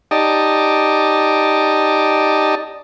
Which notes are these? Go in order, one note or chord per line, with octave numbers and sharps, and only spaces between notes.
D#4 G4 D5 D#5 A5